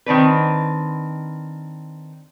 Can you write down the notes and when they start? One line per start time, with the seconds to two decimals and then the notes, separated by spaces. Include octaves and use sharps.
0.06 D#3 C4 D4 B4